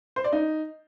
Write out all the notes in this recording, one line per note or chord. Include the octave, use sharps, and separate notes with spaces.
C5
D5
D#4